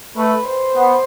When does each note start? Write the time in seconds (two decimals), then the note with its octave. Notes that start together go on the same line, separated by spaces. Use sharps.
0.16 A3 B4
0.46 C5
0.75 B3